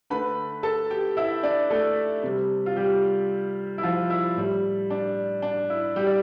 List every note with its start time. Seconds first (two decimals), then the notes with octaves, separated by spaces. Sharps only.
0.10 D3 A3 B4 B5
0.63 A4 A5
0.90 G4 G5
1.17 E4 E5
1.43 D4 D5
1.70 A3 A4
2.23 C3 G3
2.66 F4
2.76 G3 G4
3.78 E4
3.83 F3 F4
4.10 E4
4.37 A2 G3
4.90 D4
5.42 D4
5.70 E4
5.96 G3 G4
6.06 D5